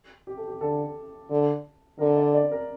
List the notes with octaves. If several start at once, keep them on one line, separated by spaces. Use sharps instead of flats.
G4
A4
G4
D3 A4
D3
D3 A#4
D5
D5
A#4